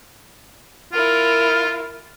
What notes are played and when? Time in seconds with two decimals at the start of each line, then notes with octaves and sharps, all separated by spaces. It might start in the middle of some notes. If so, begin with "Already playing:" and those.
0.93 E4 F4 A#4